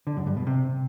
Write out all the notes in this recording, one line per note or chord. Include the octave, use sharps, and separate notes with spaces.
D3
F#2
G2
B2
C3